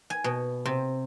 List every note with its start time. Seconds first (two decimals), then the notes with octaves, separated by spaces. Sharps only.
0.10 G#5
0.24 B2
0.65 C3